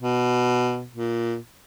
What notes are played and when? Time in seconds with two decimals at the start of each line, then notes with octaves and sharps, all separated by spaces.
0.01 B2
0.95 A#2